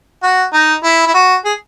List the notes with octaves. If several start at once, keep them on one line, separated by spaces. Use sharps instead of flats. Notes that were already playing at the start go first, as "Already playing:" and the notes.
F#4
D#4
E4
E4
F#4
G#4